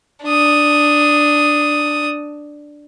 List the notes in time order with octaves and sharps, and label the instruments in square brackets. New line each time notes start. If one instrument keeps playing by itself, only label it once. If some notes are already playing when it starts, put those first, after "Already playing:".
[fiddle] D4 D#6